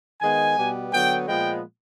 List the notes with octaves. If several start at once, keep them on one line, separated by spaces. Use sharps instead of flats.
D#3 G#3 B3 G#5
B2 G3 B3
D3 F#3 B3 G5
A#2 F3 G#3 B3 G5